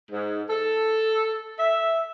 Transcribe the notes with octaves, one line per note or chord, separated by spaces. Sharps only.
G#2
A4
E5